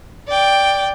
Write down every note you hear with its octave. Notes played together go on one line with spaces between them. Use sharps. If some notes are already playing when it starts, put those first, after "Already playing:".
D5 G5